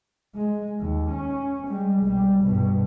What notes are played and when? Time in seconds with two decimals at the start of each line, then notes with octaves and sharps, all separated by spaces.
0.35 G#3
0.81 D#2
1.11 C#4
1.68 G3 G#3
2.03 B1 G3
2.43 G2 B2